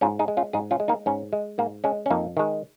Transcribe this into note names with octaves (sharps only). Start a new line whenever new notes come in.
G#2 C#4 F4
D#4 G#4
G#3
C#4 F4
G#2 D#4 G#4
C#4 F4
G#3
A#3 D#4
G#2 C#4
G#3
G#2 A#3
G#3 C#4
C#4
F2 A#3 D#4
D#3 G#3